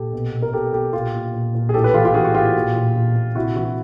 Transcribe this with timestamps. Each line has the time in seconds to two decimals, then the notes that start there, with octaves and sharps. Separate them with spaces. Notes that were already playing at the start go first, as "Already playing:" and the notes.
Already playing: A#2 G4 A4
0.13 B2
0.33 B2
0.42 A#4
0.53 B2 G4 A4
0.73 B2 G4 A4
0.93 A#2 F4 G4
1.14 A#2
1.34 A#2
1.55 A#2
1.69 G#4
1.74 A2 G4 A4
1.84 A4 B4
1.94 E3 F4 G4
2.05 F4 G4
2.14 E3 F#4 G#4
2.25 F#4
2.35 A2 F4 G4
2.56 A#2
2.75 A#2
2.96 A#2
3.16 A#2
3.35 C3 E4 F#4
3.56 E3 E4 F#4